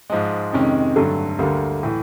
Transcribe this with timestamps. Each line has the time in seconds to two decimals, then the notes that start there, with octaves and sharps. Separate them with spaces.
0.10 G#2 F3 G#3
0.52 F2 C3 D#3 G#3 C#4
0.96 G2 D3 F#3 A3
1.39 D2 D3 G3 A#3
1.83 A2 E3